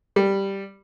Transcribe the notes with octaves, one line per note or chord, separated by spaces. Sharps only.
G3